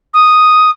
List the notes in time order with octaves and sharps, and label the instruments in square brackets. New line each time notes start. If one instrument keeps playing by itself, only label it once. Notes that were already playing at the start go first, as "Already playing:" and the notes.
[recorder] D#6